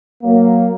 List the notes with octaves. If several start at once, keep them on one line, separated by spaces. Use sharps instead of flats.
F#3 A#3